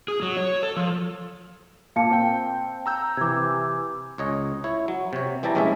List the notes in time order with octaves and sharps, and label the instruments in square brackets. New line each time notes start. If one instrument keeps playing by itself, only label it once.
[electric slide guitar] G#4
F#3
C#5
A4
F3
[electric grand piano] A#2 A#3 [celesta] F5 A5 C#7
[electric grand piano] C4 G5
A#5 E6 G6
[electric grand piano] C3 E3 [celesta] D6 G#6
[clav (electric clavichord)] C#2 C#5 D#5
E4 C#5
F#3
C3 C#5
E3 G3 E4 G4 A5 A#5
A#1 G#3 C#4 E4 A4 E5